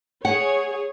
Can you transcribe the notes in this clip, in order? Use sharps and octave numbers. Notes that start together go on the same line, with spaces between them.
G#4 C#5 F#5